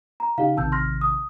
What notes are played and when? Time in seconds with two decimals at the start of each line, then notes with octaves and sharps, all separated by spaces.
0.20 A#5
0.38 C#3 D#4 G4 F5
0.57 A1 C3 D#3 A5 E6 G6
0.72 C6 F6 A#6
1.01 D#6